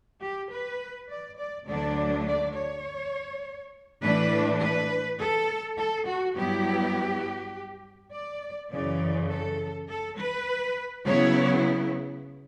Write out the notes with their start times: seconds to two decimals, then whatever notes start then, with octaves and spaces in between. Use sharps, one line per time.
0.21 G4
0.50 B4
1.09 D5
1.37 D5
1.66 D2 D3 F#3 A3 D4 D5
2.26 D5
2.54 C#5
4.01 A2 E3 A3 D4 B4
4.61 B4
5.18 A4
5.77 A4
6.06 F#4
6.36 G2 F#3 B3 E4 G4
8.11 D5
8.71 F#2 C#3 E3 D5
9.29 A4
9.88 A4
10.17 B4
11.05 C#3 F#3 B3 E4 C#5